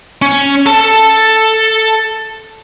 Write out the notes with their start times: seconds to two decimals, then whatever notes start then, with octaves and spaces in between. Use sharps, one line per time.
0.22 C#4
0.66 A4 A5